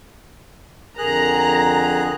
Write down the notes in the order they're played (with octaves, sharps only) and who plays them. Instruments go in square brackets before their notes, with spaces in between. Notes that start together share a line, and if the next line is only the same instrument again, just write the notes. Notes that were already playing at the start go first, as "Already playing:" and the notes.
[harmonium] F2 D3 [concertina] G#4 F#6 [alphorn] A#4 [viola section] A#5